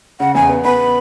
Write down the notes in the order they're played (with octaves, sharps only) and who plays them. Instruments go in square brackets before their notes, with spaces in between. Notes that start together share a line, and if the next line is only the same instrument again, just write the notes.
[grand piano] C#3 [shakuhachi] F#5
[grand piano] E2 [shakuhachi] G#5
[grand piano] B3
[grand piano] B3 [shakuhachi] B5